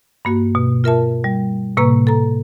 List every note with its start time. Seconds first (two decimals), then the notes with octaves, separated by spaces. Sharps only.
0.25 G2 A#3 F#4
0.55 B2
0.84 F4 A#4 E5 A5
1.24 G3
1.77 A2 C3 A#3 B4 A#5 C#6
2.07 A4 A#5